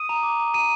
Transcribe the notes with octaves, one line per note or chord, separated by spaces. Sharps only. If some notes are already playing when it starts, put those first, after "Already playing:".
Already playing: D#6 D#7
A#5
D6
A#5
A#5 D#7